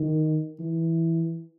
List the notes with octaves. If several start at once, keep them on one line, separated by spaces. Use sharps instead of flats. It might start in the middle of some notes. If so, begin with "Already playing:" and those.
Already playing: D#3
E3